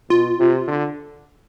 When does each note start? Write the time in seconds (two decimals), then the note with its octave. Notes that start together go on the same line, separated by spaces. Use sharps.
0.10 B2 F4
0.40 C3
0.68 D3